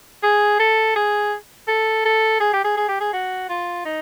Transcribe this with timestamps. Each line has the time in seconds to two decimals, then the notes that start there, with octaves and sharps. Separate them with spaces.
0.23 G#4
0.60 A4
0.96 G#4
1.68 A4
2.05 A4
2.40 G#4
2.54 G4
2.64 G#4
2.77 G#4
2.88 G4
3.00 G#4
3.13 F#4
3.49 F4
3.85 D#4